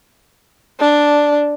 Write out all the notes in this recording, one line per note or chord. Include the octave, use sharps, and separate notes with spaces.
D4